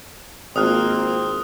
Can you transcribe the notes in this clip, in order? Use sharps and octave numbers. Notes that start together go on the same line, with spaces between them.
G#1 A#3 C4 F4 D#6 F6 F#6